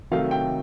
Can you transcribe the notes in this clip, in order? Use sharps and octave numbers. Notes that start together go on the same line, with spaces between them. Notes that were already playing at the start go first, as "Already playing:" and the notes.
C3 D#3 F#3 A3 F5
G5